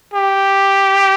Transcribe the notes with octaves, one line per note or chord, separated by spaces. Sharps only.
G4